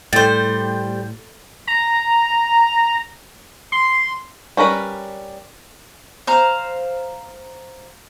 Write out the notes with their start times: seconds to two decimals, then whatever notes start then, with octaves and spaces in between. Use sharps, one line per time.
0.13 A2 G3 A4 C5 G5 G6 A6
1.67 A#5
3.72 C6
4.57 G3 C#4 A#4 B4
6.27 C5 F5 A#5